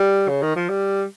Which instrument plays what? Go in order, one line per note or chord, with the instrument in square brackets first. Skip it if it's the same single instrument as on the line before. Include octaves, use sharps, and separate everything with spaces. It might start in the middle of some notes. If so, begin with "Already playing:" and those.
Already playing: [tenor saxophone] G3
C#3
D#3
F3
G3